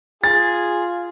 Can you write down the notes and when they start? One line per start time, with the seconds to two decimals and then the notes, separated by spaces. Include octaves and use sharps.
0.24 F4 G#4 A6